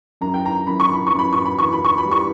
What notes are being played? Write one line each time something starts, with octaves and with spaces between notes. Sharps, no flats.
F#2 A#5
G5
A#5
F#2 B5
C#6
B5
C#6
F#2
B5
C#6
B5
E3 C#6
B5
C#6
B5
G3
C#6